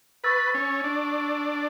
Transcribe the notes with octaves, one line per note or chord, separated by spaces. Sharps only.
B4 C#6 E6 A6
C#4
D4